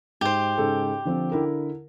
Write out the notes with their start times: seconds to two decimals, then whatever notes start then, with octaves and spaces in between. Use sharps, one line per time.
0.21 G#2 G4 C5
0.58 G#2 C#3 A4
1.05 D3 F3 C4
1.32 D3 E4 A#4